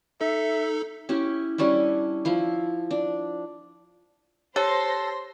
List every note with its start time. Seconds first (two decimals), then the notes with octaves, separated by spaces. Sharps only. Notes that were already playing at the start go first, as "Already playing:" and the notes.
0.21 D#4 A4 E5
1.09 C#4 E4 G4
1.58 G3 C#4 D4 E4
2.25 F3 E4
2.91 D4
4.56 G4 A4 C5 C#5 C6 A#6